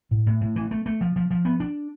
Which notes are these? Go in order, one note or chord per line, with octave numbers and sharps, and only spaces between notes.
A2
A2
A2
E3
A3
A3
F3
F3
F3
B3
D4